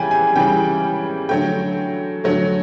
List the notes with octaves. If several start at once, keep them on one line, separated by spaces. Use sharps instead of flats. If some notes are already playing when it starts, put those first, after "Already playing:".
Already playing: C#3 E3 G3 G5 G#5
G#5
C#3 E3 G3 G5
D3 F#3 A3 G5
D3 F#3 A3